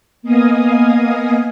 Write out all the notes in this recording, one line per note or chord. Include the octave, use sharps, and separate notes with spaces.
A#3 B3 D#5 F5 G#5 D#6